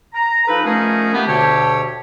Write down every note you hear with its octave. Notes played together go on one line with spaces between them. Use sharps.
A#5
F3 D#4 A4 B4
F3 A3 C#4 D#4 G#4 A#4
A3 B3 G4
D2 B2 D3 G4 C#5 A5